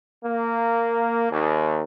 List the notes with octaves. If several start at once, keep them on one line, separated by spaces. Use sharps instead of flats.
A#3
D#2